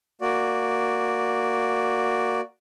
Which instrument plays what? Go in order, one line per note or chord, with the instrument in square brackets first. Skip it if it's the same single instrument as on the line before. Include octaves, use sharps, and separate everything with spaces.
[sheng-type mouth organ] A#3 F#4 D5